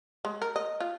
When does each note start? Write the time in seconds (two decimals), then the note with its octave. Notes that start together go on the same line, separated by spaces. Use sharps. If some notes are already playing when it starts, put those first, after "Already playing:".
0.25 G#3
0.42 A#4
0.56 D#5
0.80 F4